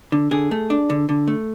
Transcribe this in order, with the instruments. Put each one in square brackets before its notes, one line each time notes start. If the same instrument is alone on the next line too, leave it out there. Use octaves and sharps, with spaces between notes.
[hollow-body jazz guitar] D3
D3 G#4
A3
D4
D3
D3
A3